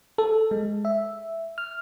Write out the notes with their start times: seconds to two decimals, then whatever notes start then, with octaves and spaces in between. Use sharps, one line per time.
0.18 A4
0.51 G#3
0.85 E5
1.58 F6